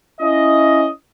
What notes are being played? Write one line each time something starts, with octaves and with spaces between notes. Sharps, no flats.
C#4 E4 D#5